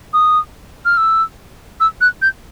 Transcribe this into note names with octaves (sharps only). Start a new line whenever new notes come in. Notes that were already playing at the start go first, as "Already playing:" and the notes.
D#6
F6
E6
E6
F#6
G6